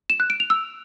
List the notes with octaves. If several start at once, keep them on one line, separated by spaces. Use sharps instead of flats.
E7
F#6
D7
F7
E6